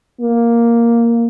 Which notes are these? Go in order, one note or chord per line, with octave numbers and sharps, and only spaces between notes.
A#3